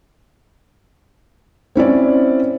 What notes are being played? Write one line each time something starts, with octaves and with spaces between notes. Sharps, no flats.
C4 C#4 E4 D5